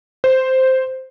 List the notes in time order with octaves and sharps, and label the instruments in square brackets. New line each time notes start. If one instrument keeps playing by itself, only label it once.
[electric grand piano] C5